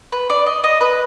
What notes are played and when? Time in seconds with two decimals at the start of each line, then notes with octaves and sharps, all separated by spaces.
0.12 B4
0.30 D5
0.46 D#5
0.64 D#5
0.81 B4